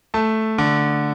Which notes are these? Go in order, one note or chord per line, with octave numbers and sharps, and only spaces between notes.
A3 A5
D3